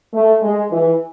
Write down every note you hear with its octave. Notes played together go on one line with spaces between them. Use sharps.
A3
G#3
E3